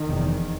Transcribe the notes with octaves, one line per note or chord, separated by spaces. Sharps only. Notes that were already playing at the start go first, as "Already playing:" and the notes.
Already playing: D#3
F1 E2 C3